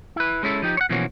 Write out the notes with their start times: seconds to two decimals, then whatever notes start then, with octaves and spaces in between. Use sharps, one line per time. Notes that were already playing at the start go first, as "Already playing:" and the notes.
0.16 E4 B4
0.43 G#3 C#4 E4 A4
0.62 F3 D#4 G4
0.77 C#5 F#5
0.89 B2 E3 F3 A#3 C#4 F#4